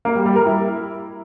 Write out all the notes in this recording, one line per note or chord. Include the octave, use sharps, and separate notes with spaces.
A#3
G3
G3
A#4
E4